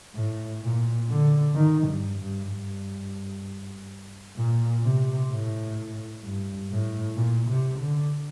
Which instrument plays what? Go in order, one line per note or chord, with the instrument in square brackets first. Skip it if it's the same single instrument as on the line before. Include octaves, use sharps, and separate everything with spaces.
[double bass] A2
A#2
D3
D#3
G2
G2
G2
A#2
C3
A2
G2
A2
A#2
C3
D3